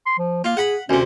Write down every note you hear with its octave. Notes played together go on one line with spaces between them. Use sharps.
C6
F3
A#3 F4
G#4 F#5 B5
D2 C3 C#4